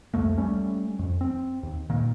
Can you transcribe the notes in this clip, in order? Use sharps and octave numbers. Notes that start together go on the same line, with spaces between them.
C2 F2 A3 A#3
G3 A3 C#4
F2
C4
D#2
A#2 D#3 A#3